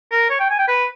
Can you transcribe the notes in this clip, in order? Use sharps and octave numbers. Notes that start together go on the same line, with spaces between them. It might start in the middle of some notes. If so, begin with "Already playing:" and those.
A#4
C#5
G5
G#5
G5
B4